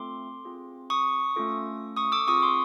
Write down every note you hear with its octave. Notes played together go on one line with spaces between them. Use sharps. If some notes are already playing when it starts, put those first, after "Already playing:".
Already playing: A3 C4 F4 A4 C6 D6
C4 F4 G#4
C#6 D#6
A3 C#4 F4 A4
C#6 D#6
D6 E6
C4 F4 G#4 C#6 D#6
C6 D6